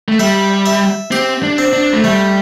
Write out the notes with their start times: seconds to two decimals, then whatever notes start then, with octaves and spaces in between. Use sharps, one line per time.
0.08 A3
0.19 G3 E5
0.66 E5
1.11 C4 G4
1.43 D4
1.58 C4
1.73 D4
1.93 A3
2.04 G3 A3